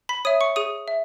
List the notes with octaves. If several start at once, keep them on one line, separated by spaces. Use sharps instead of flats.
B5 B6
C#5 E5 D#6 D#7
C#6 C#7
G#4 D#6 D#7
E5